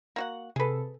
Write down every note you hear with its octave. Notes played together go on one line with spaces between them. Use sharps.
A#3 F#4 F#5
C3 G#4 A4 B4